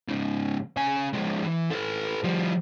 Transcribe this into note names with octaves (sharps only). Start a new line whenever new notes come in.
G#2 C#3
C#3 G#5
F3 G#3
E3
A4 B4
F3 G3